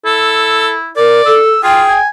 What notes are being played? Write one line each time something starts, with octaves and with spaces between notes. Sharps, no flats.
E4 A4
A#4 D5
A4 E6
F4 G#4 G5
G#5